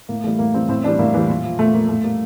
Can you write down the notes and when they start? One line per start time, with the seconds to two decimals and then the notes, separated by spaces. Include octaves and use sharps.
0.09 A2 A#3
0.24 E3 G3 A3
0.39 A2 A#3
0.54 E3 G3 C4
0.69 A2 C4
0.84 E3 G3 D4
0.99 A2 A#3
1.14 E3 G3
1.29 A#2
1.44 F3
1.59 A#2 A3
1.74 F3 A#3
1.89 A2 A3
2.04 G3 A#3